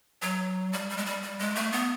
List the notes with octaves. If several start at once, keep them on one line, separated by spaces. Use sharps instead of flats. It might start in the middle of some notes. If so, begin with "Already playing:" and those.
F#3
G3
G3
G#3
G3
G3
G#3
A3
B3